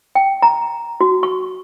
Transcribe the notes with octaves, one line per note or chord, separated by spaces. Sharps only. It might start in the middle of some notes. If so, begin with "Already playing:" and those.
G5
A#5
F#4
C#6